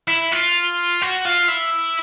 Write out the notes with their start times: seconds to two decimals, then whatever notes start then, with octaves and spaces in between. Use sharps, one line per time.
0.08 E4
0.32 F4
1.02 F#4
1.25 F4
1.48 E4